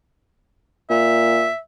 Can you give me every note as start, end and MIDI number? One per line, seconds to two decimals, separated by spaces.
0.90 1.48 46
0.90 1.57 76